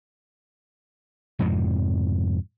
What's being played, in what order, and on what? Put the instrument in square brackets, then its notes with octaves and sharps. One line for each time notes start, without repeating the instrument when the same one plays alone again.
[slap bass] F2 G#2 C3 F3